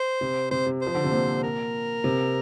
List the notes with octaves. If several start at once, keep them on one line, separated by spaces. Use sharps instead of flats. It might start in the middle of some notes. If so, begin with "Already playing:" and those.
Already playing: C5
C3
C3 C5
C3
F3 C5
D3
C3
A#2
A#4
C3